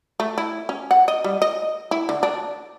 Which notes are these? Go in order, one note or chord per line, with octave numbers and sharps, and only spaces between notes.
A3
E4
C#4
F#5
D#5
G3
D#5
E4
D3
D4